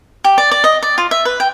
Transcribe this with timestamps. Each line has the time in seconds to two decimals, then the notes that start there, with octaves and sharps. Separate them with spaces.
0.24 G4
0.38 D5
0.51 D5
0.64 D#5
0.83 D5
0.98 F4
1.11 E5
1.25 B4
1.40 G5